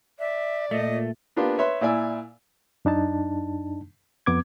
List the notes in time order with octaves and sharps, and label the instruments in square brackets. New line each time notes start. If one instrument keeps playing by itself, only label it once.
[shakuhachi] D5 [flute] E5
[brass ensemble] A#2 [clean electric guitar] A3 [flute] D#5
[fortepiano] A#3 B3 D4 F4 G4
B4 C#5 E5 B5 C6
A#2 E4 D5 G#5 E6
[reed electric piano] F#2 D4 D#4 A5
F2 B3 D6 G#6